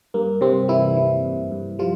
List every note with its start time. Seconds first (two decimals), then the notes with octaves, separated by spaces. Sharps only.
0.14 G2 A#3
0.41 G2 C3 C4
0.68 E3 G3 E4
0.96 E3
1.24 G2
1.51 G2
1.79 F3 G3 F4